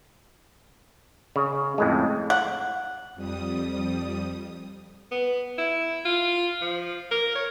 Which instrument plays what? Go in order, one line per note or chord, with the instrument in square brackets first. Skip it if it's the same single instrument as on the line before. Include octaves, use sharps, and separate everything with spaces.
[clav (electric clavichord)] C#3
F2 A2 G#3
[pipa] F#5
[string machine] F2 G3 D#6
[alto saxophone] B3
E4
F4
F3
A#4
C#5